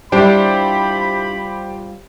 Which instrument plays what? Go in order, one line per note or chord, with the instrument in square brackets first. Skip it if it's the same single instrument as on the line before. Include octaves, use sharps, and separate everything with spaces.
[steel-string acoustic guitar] G3 F4 [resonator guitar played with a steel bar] D4 E4 [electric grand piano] G4 C5 G5 [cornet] B5